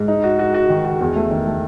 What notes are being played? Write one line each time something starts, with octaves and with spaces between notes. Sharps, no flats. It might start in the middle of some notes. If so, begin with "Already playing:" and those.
Already playing: G#2
D#4
F#4
F#4
F#4
D#3
F#4
E2
A3
D#3
A3